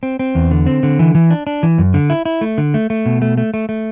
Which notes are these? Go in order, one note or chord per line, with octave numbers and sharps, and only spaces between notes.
C4
C4
E2
D3
C4
D3
E3
E3
D4
D4
E3
F#2
D3
E4
E4
A3
D3
A3
A3
B2
A3
A3
A3
A3